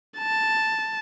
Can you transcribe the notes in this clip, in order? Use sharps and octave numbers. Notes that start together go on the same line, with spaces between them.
A5